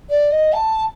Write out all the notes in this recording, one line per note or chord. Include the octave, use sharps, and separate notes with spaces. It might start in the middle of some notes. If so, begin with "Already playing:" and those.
D5
D#5
A5